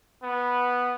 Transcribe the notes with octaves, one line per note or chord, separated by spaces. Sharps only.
B3